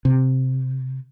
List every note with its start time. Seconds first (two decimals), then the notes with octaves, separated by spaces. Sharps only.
0.05 C3